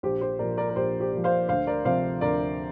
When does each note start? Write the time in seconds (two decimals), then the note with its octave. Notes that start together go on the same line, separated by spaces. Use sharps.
0.03 A#1 G4 C5
0.21 G4 C5
0.39 A#2 F3 A#4 D5
0.57 A#4 D5
0.69 A#4
0.76 A#1 G4 C5
1.00 G4 C5
1.12 A#2 F3
1.24 C5 F5
1.48 D2 C5 F5
1.67 A#4 D5
1.85 C3 F3 C5 F5
2.21 D2 A#4 D5